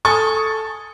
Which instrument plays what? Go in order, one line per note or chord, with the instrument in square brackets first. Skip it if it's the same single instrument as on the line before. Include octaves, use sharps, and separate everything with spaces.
[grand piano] A4 G#5 C#6 D#6 A6